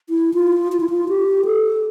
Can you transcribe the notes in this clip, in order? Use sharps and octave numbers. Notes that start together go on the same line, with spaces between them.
E4
F4
F4
E4
F4
G4
A4